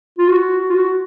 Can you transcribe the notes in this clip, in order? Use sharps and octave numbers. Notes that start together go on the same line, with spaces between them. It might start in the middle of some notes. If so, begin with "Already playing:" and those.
F4
F#4
F4
F#4